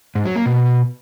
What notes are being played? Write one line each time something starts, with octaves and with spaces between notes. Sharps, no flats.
G#2
F#3
A#3
B2